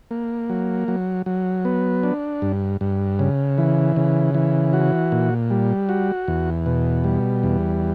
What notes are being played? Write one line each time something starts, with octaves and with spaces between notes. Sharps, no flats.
A#3
F#3
F#3
F#3
B3
D4
G2
G2
C#3
E3
C#3
E3
F#4
A#2
G3
F#4
E2
B2
G3
E2